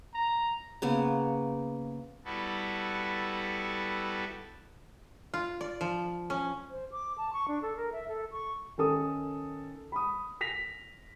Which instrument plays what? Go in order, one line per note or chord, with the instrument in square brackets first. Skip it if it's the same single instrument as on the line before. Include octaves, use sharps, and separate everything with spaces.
[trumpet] A#5
[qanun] C#3 A#3 B3
[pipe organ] G3 B3 E4 F#4 A4
[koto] F4
D5
F3
C#4
[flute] C5
D6
A5
C#6
D4
A4
A#4
E5
A4
C#6
[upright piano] D#3 C#4 A4 D#6
B5 D#6
A#6 B6 F7